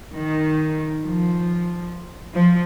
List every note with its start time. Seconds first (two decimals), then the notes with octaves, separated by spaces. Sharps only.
0.13 D#3
1.03 F3
2.33 F3